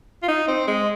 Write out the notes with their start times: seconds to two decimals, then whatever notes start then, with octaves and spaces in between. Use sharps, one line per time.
0.23 F4
0.28 D#4
0.48 C4
0.68 G#3